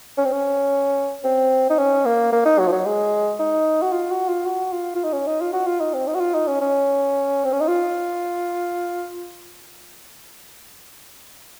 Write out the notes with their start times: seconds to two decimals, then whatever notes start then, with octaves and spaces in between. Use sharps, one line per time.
0.18 C#4
0.25 C4
0.32 C#4
1.24 C4
1.70 D#4
1.79 C#4
2.05 A#3
2.33 A#3
2.46 D#4
2.59 F#3
2.67 F3
2.72 F#3
2.86 G#3
3.40 D#4
3.82 F#4
3.93 F4
4.11 F#4
4.29 F4
4.46 F#4
4.73 F4
4.96 F4
5.04 D#4
5.13 C#4
5.27 D#4
5.41 F4
5.53 F#4
5.67 F4
5.80 D#4
5.94 C4
6.07 D#4
6.15 F#4
6.21 F4
6.34 D#4
6.48 C#4
6.61 C#4
7.45 C4
7.53 C#4
7.61 D#4
7.68 F4